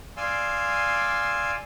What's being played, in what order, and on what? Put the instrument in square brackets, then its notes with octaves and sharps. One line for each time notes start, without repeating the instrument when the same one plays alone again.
[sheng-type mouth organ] D5 F5 G#5 C6 E6